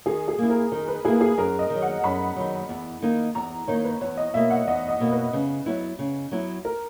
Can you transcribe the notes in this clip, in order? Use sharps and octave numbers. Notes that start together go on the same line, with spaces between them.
D#3 G#4
G#4
A#3 E4
A#4
D#3 A#4
B4
A#3 E4 G#4
G#4
F#2 A#4
D#5
D#3 F#3
F#5
F#2 B5
D#3 F#3
E2
D#3 A#3 D#4
E2 A#5
D#3 A#3 D#4 C#5
B4
E2 C#5
D#5
B2 A#3 E5
F#5
E2 D#5
D#5
B2 A#3
B4
C#3
F#3 B3 E4
C#3
F#3 B3 E4
A#4